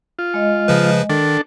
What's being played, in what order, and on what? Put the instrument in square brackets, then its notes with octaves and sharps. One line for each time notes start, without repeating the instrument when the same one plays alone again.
[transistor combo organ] F4
[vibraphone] G#3 D#5
[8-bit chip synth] C#3 F3 B4
[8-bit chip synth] D#3 [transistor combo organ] D4 A4